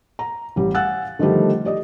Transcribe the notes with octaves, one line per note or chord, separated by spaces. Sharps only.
A#5
A1 G3
F5 F#5 G#5 E6 F#6 A6
D3 D#3 F3 G3 A3
G4 D5 D#5